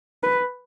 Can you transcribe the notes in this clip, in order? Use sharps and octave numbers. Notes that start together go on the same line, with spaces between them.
B4